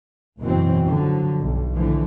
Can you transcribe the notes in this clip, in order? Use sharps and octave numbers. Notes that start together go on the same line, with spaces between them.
F#1 G#2 B2 E3 F#3 C4
D3 F3 F#3
B1 G2
A2 D3 E3 F3